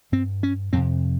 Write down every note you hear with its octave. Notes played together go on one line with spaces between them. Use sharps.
G2 C4
C#4
F2 C3 C4